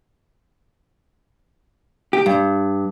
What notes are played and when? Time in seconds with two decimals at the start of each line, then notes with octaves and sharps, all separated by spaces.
2.13 G4
2.26 G2